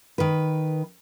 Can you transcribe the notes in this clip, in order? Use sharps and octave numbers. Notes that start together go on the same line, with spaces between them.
D#3 B4